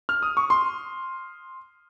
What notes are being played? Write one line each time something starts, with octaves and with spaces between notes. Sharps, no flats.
F6
D#6
C#6
C6